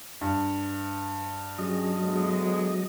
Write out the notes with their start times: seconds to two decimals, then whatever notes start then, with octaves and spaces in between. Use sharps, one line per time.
0.21 G2
1.59 F#3 C#4 G4 G#4 D#5
2.03 D2 G#3 B3